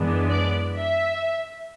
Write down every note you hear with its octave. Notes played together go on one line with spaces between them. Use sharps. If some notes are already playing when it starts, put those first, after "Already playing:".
Already playing: F#2 E3 G#3 B3 D4
D5
E5